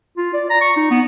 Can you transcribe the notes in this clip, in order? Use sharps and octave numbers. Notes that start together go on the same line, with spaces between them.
F4
D5
A#5
C#6
D#4
B3